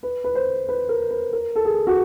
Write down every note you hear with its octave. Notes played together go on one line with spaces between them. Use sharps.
B4
B4
C5
B4
A#4
B4
A#4
A4
G#4
F#4